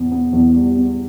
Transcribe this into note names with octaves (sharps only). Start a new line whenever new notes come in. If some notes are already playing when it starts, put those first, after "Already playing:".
Already playing: E2 B3
B3
E2
G3
B3